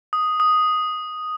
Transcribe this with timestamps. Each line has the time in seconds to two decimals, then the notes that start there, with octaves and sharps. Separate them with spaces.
0.13 D#6
0.40 D#6